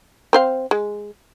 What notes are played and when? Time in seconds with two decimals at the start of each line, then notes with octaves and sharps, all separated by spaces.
0.33 C4 C5 F5
0.71 G#3